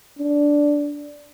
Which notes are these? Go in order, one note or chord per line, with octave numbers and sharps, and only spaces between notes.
D4